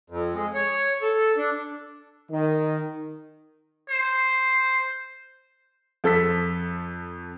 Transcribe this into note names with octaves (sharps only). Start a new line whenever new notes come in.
F2
G#3
C#5
A4
D4
D#3
C5
F2 A4 E6 B6